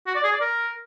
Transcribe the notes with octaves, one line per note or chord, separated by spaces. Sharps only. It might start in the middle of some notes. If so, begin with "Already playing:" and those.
F#4
D5
G#4
D5
A#4